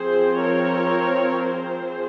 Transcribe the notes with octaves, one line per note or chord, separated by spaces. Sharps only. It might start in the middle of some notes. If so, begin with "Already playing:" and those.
Already playing: F3 C4 G#4 C5
A#4 C#5
G#4 C5